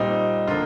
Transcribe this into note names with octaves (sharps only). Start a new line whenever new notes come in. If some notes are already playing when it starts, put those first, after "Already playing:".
Already playing: A#2 G3 C4 D#4
D3 F3 A#3 F4